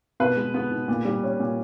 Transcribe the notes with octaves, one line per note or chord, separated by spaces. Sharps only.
B2 B4
G#3
B3
B2
A#2
G3
C#4
A#2